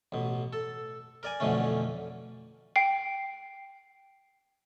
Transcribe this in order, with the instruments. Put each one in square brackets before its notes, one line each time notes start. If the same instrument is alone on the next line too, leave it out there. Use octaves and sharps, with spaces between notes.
[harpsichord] A1 B2
A4
A#4 D5 G#5
F2 B2 D3 E3 A3 C#4
[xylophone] G5 C7